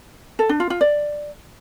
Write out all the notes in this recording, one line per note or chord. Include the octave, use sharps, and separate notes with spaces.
A4
D4
F4
F4
D5